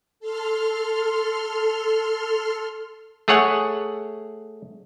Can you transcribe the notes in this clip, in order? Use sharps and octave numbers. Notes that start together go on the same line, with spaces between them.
A4 C6 F6
A3 G#4 C#5 F#5